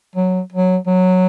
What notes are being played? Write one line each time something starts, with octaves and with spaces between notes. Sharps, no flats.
F#3
F#3
F#3